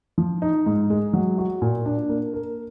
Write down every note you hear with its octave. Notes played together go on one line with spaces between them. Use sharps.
F3
D#4
G#2
G#3
F#3
F#4
A#2
D4
A#3
A#4